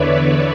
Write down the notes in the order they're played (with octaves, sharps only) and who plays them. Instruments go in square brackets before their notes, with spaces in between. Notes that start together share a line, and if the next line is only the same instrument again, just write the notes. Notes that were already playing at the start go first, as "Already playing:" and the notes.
Already playing: [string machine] E2 D3 B4 C#5 D5 E5